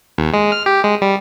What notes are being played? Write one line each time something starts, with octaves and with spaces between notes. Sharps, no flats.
D#2
G#3
F6
G4
G#3
G3